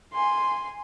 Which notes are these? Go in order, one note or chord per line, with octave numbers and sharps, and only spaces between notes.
G#5 C6